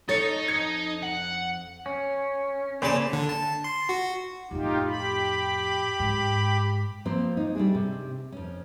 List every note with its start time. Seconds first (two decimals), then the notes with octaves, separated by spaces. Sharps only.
0.09 D#4 A4 C#5 A6 C#7
0.48 F2 G#6 C#7
1.03 F#5
1.86 C#4
2.82 A#2 C#3 C5 G#5 A5 B5
3.13 D3
3.29 A5
3.64 C6
3.89 F#4
4.51 F2 A2 D#4 F4 G4
4.87 G4 B5
6.00 G#2
7.05 F3 A#3 C4 C5
7.37 D#4
7.55 G3 A3 D4 G#4
7.75 C3
8.32 F2 C#4